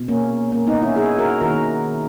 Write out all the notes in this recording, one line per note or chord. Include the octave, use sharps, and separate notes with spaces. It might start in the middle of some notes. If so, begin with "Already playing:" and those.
Already playing: B2
A#3 C#4
A#3 C#4
B3 D#4
C#4 E4
E4 G#4
F#4 A#4
D#3 A#3 F#4 A#4